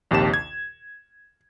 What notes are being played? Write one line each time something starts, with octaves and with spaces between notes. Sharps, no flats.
A#1 D#2 C3 G4 A5 E7
G#6